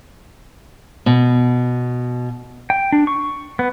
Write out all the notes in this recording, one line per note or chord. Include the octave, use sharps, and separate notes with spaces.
B2
G5
D4
C#6
B3